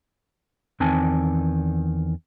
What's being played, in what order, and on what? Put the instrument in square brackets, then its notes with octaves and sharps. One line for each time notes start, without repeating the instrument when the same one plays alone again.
[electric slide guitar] E2 D#3 C4 G#5 A5